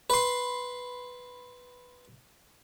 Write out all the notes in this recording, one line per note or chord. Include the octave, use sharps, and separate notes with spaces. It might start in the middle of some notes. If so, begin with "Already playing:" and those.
B4 C6